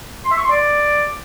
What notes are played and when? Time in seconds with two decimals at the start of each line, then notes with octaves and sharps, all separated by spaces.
0.25 C6
0.31 E5
0.38 C#6
0.44 C6
0.50 D5